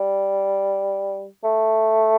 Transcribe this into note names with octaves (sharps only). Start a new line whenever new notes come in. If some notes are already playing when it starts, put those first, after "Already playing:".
Already playing: G3
A3